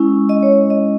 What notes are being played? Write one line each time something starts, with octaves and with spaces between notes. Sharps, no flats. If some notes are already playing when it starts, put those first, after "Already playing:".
Already playing: G#3 C#4 E4
D#5
C#5
D#5